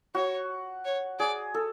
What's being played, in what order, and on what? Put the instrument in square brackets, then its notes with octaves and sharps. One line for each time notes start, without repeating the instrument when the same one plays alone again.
[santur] F#4 [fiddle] C#5
[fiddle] C#5
[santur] G#4 [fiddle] D5
[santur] A4